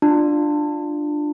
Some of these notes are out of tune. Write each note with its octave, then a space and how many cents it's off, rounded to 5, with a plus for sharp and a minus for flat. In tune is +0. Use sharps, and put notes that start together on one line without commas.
D4 +15 F4 +0